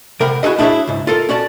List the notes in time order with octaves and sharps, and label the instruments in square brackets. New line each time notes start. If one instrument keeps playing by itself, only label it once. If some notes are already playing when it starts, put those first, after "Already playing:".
[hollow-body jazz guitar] C3 A#4 F#5 G5 B5
E4 F#4 G#4 A4 D#5
D4 E4 G#4 B4 C#5 E5
C#2 G#2
F4 A4 A#4
C#4 F#4 D5 A5